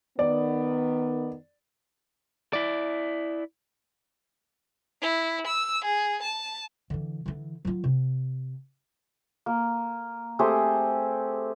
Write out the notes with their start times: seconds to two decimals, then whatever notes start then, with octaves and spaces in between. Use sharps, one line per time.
0.19 D#3 B3 D5
2.53 E4 D5
5.01 E4
5.47 E6
5.84 G#4
6.22 A5
6.90 D3 E3
7.26 D3 E3
7.65 F#3 F4
7.84 C3
9.46 A#3
10.39 A3 C4 G4 G#4